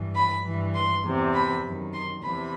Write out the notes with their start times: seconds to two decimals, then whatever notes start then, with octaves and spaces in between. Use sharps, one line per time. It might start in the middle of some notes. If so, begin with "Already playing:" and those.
Already playing: G2 E3
0.14 B5
0.43 G2 E3
0.74 C6
1.03 E2 C3 E3
1.33 B5
1.64 F#2 D#3
1.93 C6
2.23 E2 C3 E3 B5